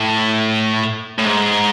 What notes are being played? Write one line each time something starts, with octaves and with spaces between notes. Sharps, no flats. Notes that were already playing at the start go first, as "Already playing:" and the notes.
Already playing: A2
A2
G#2